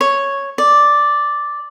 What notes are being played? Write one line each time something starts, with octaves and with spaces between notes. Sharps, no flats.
C#5
D5